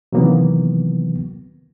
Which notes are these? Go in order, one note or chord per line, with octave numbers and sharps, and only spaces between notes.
C3 D#3 E3 F#3 A#3 B3